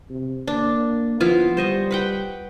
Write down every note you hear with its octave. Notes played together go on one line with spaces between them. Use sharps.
C3
A#3 D4
F3 B3 E4 F4
G3 C5 D#5 C#6
B4 F#5 G5